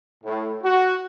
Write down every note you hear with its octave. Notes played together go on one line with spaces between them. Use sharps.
A2
F#4